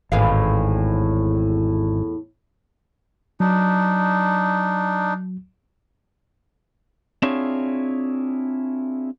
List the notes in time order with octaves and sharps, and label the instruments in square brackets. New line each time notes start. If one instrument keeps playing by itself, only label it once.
[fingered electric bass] G#1 [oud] E2 A2 F5
[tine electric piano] F#3 [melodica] D4 D#4
[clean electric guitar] C4 D4 E4 F4 G#4 C#5